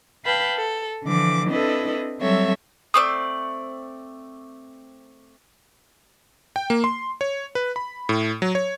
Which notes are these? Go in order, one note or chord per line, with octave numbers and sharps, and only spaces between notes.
B4 F5 G5 A5 B5
A4
D3 E3 F3 D6
C4 D4 E4 A4 B4 D#5
F#3 G3 C4 A4 C#5 E5
A3 C4 D5 D#6 E6
G5
A#3
C6
C#5
B4
B5
A2
F#3
C#5